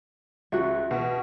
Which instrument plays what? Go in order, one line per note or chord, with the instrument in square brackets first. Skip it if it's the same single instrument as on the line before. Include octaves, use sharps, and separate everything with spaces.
[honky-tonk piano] C#2 [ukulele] F#4 E5
[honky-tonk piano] B2